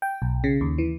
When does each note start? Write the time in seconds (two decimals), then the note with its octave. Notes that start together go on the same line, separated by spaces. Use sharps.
0.02 G5
0.22 B1
0.44 C#3
0.61 D#2
0.78 E3